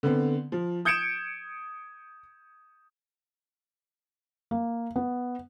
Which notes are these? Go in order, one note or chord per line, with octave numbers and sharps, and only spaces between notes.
D3 B3 C4
F3
D#6 G6 G#6 C#7 D7 E7
A#3
B3